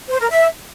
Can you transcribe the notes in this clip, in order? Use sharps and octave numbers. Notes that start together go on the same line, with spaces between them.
C5
A#4
E5